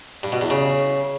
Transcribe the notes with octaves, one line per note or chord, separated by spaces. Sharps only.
G2
B2
E2
C#3